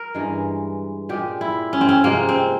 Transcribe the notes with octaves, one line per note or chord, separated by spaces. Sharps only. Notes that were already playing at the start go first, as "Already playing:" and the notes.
Already playing: A#4
G2 E3 G#3
A#2 G#3 G4
E4
C#4
C4
C#4
C3 F3 G#3 A#3
C4